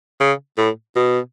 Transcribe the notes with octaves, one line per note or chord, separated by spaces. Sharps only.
C#3
A2
B2